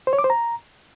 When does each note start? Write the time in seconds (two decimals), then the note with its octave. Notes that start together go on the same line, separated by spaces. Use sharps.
0.07 C5
0.13 C#5
0.19 D6
0.24 C5
0.30 A#5